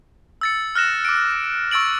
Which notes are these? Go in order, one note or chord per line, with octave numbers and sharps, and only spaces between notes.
E6 A6 C#7
F6 F#6 A#6 E7
D6 D7
C#6 E6 A6 D7 F#7